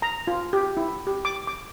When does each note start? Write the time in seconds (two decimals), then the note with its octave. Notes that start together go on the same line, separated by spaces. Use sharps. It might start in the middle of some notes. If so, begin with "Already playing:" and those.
0.02 A#5
0.27 F4
0.53 G4
0.77 E4
1.07 G4
1.25 D6
1.47 D6